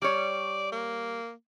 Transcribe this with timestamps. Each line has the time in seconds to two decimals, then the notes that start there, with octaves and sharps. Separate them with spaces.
0.02 G3 C#5 D5
0.72 A#3